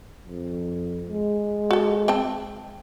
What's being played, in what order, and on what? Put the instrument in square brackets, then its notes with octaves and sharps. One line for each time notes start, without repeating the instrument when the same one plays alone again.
[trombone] F2
G#3
[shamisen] F#4 A4
C4 G5 A5